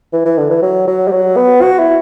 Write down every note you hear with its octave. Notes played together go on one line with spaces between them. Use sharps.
E3
E3
D3
E3
F#3
F#3
G3
F#3
B3
F#4
E4